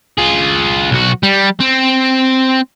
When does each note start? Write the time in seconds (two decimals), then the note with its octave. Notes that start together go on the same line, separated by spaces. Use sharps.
0.18 F4 G#4
0.91 B1 F#4
1.23 G3
1.60 C4